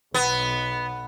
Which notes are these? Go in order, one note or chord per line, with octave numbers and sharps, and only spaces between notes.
B1 B3